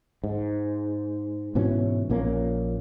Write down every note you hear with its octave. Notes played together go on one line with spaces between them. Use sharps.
G#2
G#2 B2 E3 C#4
A#1 A#2 A#3 C#4